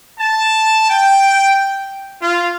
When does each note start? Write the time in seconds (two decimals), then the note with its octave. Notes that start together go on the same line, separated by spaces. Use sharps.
0.20 A5
0.90 G5
2.22 F4